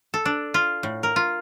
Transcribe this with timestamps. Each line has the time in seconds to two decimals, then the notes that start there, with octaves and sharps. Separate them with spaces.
0.14 A4
0.25 D4
0.54 F4
0.83 A2
1.03 A#4
1.16 F4